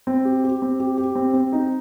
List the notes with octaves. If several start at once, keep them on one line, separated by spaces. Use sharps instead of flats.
C4
G4
G4
C4
G4
G4
C4
C4
D#4